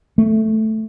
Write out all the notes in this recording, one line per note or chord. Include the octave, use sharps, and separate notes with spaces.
A3